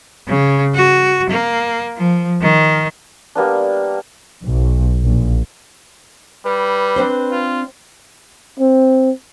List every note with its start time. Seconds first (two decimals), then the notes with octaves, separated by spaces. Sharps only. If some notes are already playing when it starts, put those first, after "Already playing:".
0.27 C#3
0.74 F#4
1.30 A#3
1.96 F3
2.41 D#3
3.35 G3 A#3 B3 D4
4.45 B1
5.06 A#1
6.45 G3 B4
6.96 C4 D4 C5
7.32 F4
8.60 C4